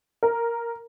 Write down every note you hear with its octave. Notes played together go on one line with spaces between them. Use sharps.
A#4